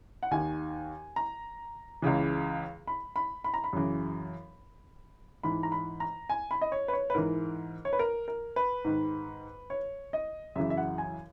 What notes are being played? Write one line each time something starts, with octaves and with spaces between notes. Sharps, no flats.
F#5
D#2 D#3 G#5
A#5
C#2 C#3 E3
B5
B5
B5
A#5
B5
F#2 C#3 E3
G#2 E3 B5
A#5
B5
A#5
G#5
B5
D#5
C#5
B4
C#5
B4
G#2 E3 A#4
C#5
B4
A#4
A#4
B4
G#2 D#3
C#5
D#5
F#2 C#3 E3 E5
E5
F#5
G#5